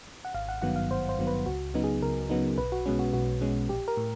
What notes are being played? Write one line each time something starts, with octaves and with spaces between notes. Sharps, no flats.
F#5
G#1 F5
F#5
G2 D#3 F#3 B3 F#5
F5
G#1 C5
C5
G2 D#3 F#3 B3
B4
C#2 F#4
C#3 F#3 B3 D#4
G#4
C#2 A#4
C#3 F#3 B3 D#4
B1 B4
F#4
B2 G#3 C#4
F#4
B1 F#4
B2 G#3 C#4
A#1 G4
A#4
A2